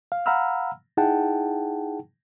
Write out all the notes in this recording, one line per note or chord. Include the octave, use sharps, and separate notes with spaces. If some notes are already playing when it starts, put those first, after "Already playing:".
F5
F5 F#5 A#5 B5 E6 F6
D#4 E4 G#4 F#5 G5 A5